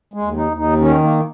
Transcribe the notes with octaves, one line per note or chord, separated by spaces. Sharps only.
G#3
D#2
D#4
D#2
D#4
D#3 C#4
A#3